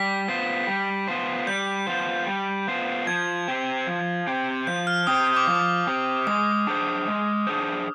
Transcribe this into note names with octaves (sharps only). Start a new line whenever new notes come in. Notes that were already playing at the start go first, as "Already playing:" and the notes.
Already playing: G3 B6
B3 F4 C5
G3
B3 F4 C5
G3 G6
B3 F4 C5
G3
B3 F4 C5
F3 G#6
C4 G4 C5
F3
C4 G4 C5
F3 G6
F6
C4 G4 C5 D#6
D#6
D6
F3
D6
C4 G4 C5
G#3 D#6
D4 G#4 C5
G#3
D4 G#4 C5